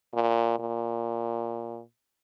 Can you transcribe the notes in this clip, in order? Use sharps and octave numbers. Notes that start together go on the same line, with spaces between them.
A#2
A#2